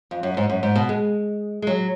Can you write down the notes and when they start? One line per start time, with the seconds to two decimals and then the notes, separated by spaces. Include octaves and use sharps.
0.11 F2
0.23 F#2
0.37 G#2
0.50 F#2
0.63 G#2
0.75 B2
0.89 G#3
1.62 G#3
1.67 F#3